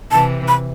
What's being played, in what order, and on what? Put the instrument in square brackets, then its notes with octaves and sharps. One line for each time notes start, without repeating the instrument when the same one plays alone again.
[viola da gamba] C3 E3 [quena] A5
[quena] B5